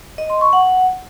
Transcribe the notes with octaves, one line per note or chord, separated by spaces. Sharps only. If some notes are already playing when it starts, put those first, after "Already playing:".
D#5
C6
C#6
F#5